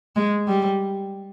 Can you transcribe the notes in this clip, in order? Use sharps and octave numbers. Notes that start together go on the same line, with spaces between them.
G#3
G3